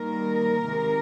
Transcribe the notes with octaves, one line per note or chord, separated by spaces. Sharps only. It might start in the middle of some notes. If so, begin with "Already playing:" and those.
Already playing: D#3 G3 A#3 A#4
C3 D#3 G#3